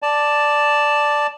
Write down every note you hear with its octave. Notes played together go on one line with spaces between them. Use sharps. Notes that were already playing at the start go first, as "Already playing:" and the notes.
D5 A5